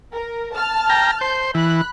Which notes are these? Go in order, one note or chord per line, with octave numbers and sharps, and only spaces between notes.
A#4
A5 F6
G5 A#5
C5 G6
E3 B5 F#6